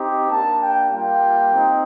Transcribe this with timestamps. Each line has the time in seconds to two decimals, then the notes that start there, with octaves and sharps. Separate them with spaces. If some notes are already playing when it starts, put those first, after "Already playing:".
Already playing: C4 D#4 G4
0.29 A#3 D4 G4 A5
0.60 G5
0.91 G3 A#3 F4 G5
1.53 C4 D#4